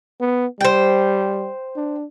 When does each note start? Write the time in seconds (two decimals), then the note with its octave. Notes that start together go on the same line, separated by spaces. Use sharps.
0.21 B3
0.61 G3 C5 G5
1.76 D4